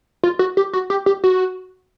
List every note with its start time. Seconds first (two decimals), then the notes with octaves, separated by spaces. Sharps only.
0.23 F4
0.39 F#4
0.57 G4
0.73 F#4
0.90 G4
1.06 G4
1.24 F#4